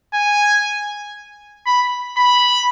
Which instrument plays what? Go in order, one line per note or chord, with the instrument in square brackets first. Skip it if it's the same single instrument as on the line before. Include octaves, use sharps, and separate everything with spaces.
[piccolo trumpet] G#5
B5
B5